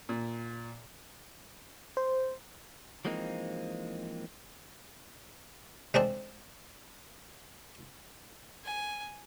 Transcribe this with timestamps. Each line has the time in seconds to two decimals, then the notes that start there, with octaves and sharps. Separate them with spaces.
0.09 A#2
1.97 C5
3.05 E3 F3 G#3 A#3 C4 D#4
5.94 G#3 C4 D4 A4
8.64 G#5